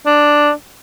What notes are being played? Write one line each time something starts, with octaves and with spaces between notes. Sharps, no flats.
D4